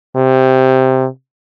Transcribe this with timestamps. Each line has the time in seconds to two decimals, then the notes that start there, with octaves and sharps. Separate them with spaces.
0.16 C3